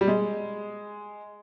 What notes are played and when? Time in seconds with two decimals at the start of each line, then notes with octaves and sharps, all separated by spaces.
0.01 G3
0.08 G#3